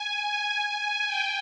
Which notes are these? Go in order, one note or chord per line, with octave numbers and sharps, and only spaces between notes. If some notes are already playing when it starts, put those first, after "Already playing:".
Already playing: G#5
G5